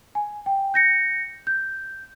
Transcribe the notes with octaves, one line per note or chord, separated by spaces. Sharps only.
G#5
G5
G6 A#6 C#7
G6